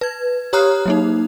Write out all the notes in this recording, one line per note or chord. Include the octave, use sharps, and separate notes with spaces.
B4 G#6
G4 C#5 A#5 D#6 F6 F#6
F#3 A#3 D#4